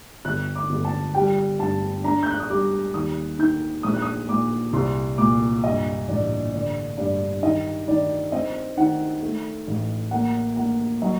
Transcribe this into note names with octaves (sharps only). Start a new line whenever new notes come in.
G1 F#6
D6
G1
A5
G3 G5
G2 A5
D4 A#5
G6
F#6
D#6
G3 D6
D#2 D#6
D#3 G6
A#1 D#6
F#6
D#6
A#2 D6
C2 C6
A#2 D6
G2 D#5
A1 D5
D3 D5
G2 D5
D#3 D#5
D#3 D5
C4 D#5
D#3 F#5
A3
A1
A#3 F#5
A#3 F#5
F#3 D#5